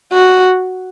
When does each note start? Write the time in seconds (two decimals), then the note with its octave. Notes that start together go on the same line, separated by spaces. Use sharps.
0.13 F#4